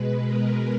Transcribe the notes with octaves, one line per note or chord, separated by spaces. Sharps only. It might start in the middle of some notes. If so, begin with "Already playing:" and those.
Already playing: B2 G#3 B4
A#4